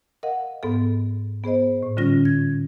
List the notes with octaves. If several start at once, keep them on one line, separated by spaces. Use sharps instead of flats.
A#4 D#5 F5 F#5
G#2 B3 A4
B3 G#4 C5 D#5
A2
D3 G3 C#4 F4 A#6
G#6